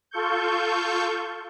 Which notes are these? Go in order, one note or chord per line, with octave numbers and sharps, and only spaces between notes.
F4 A4 C#6 G6